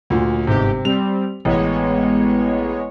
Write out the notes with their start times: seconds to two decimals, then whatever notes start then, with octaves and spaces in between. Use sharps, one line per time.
0.10 D2 A#2
0.47 G1 G#2 C3 G4
0.85 G3 C4 F7
1.45 A1 G#3 B3 C#5